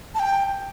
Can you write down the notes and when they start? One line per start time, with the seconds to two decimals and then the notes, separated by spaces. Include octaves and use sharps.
0.15 A5
0.19 G5